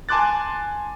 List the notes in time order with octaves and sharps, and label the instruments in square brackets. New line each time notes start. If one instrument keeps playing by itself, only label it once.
[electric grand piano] G#5 A5 C6 D6 F#6 A6